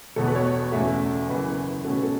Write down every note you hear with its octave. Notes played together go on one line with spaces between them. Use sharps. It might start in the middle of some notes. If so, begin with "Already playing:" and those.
E1 E2 B2 B3 A4
B4
C#5
E1 E2 C#3 A3 E5
F#1 E2 E3 B4
C#2 B2 A3 C#4 A4
B4
A4